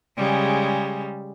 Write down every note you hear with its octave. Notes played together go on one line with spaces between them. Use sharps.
C#3 G3 G#3